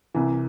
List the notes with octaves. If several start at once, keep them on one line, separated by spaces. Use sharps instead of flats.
C2 C3 E3